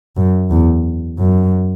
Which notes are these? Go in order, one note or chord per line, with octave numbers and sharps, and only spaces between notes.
F#2
E2
F#2